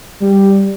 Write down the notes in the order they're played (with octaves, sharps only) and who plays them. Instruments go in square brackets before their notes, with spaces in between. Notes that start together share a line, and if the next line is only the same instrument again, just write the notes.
[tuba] G3